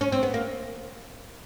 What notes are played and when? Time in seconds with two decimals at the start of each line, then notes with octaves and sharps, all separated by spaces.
0.01 C#4
0.12 C4
0.23 B3
0.34 A#3